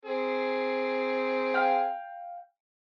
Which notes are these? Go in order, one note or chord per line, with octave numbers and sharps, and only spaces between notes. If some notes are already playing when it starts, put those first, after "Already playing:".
C4 G#4
F5 G5